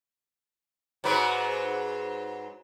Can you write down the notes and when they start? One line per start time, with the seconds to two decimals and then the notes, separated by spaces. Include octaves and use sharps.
1.04 G#2 F#3 B4